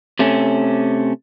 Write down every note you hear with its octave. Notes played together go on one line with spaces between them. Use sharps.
C3 A3 C#4